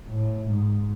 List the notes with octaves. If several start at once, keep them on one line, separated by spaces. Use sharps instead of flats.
A2
G#2